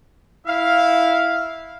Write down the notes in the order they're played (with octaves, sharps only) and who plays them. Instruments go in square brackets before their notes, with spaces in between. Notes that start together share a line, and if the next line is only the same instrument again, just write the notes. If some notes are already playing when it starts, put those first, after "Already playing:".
[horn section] E4 E5 F5